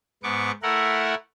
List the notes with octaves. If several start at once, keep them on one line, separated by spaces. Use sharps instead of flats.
G#2 B3 C#6 D6
A3 E4 A#4 F#5